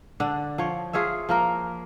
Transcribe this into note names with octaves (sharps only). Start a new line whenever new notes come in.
D3 D4
F3 C#5
F4 G#4 C#5 E5
F3 A#3 A#4